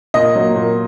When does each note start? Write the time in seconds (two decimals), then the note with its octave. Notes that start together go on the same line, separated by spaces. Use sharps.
0.14 A#2 D#5
0.35 F#3 A#3
0.56 A#2